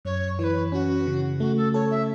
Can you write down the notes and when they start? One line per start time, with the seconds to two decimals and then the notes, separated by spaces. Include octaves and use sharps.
0.05 F#2 C#5
0.39 E3 C#5
0.44 B4
0.72 C#4 F#4
1.07 C#3
1.40 A3 F#4
1.57 A4
1.74 A4 C#5
1.91 E5